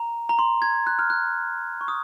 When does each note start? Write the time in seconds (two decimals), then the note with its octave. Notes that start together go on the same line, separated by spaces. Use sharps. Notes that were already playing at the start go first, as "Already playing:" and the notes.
Already playing: A#5
0.29 A#5
0.39 C6
0.62 G#6
0.87 F#6
0.99 F6
1.10 F#6
1.81 C#6
1.88 D#6